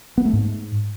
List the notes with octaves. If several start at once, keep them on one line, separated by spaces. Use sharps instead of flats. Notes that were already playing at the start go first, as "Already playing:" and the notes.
B3
A3
G#2